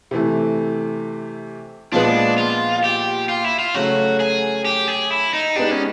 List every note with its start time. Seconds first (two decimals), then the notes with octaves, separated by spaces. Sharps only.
0.11 C3 E3 A3
1.92 A#2 F3 G#3 B3 D4
2.38 F4
2.84 G4
3.29 F4
3.44 E4
3.59 F4
3.74 C#3 F#3 A3 F#4
4.20 G#4
4.65 G4
4.88 G#4
5.10 E4
5.33 D#4
5.56 G#3 B3 D4 D#4 G4
5.71 C#4